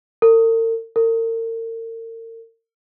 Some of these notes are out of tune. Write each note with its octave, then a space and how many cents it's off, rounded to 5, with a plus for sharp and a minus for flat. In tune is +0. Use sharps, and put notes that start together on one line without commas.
A#4 -45
A#4 -40